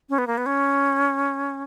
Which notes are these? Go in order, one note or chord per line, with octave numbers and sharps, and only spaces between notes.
C#4
B3
A#3
B3
C#4